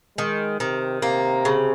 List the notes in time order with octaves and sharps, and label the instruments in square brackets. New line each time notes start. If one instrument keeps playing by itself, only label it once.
[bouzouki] D#3 [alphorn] G#3
[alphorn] C3 [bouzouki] D#3
[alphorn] C3 [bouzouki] A#3
[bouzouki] C#3